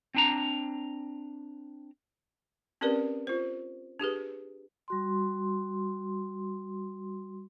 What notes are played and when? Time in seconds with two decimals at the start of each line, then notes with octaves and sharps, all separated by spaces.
0.15 C4 D4 A#5
2.81 C4 C#4 G4 A#4 B4 D5
3.27 F4 C5
4.00 D4 G4 G#4 B4
4.88 G3 F#4 C6